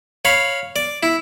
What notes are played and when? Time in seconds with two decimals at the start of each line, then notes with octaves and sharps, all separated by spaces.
0.25 C#5 F5 B5
0.76 D5
1.03 E4